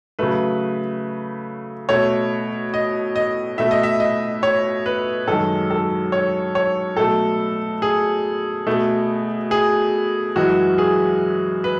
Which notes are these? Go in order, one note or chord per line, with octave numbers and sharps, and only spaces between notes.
C#3 F#3 A3 B4
B2 A3 C#5
D#5
D#5
B2 A3 E5
D#5
E5
D#5
C#5
B4
F#2 D#3 G#3 A4
A4
C#5
C#5
B2 F#3 A3 A4
G#4
B2 A3
G#4
F#2 E3 G#3 F#4
G#4
B4